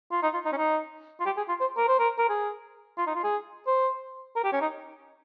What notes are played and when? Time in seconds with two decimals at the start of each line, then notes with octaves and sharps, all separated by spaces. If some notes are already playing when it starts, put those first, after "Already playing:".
0.11 F4
0.23 D#4
0.34 F4
0.45 D#4
0.53 C#4
0.57 D#4
1.20 F4
1.26 G4
1.37 G#4
1.49 F4
1.60 C5
1.77 A#4
1.88 C5
1.99 A#4
2.19 A#4
2.29 G#4
2.98 F4
3.07 D#4
3.15 F4
3.24 G#4
3.67 C5
4.36 A#4
4.44 G4
4.53 C#4
4.61 D#4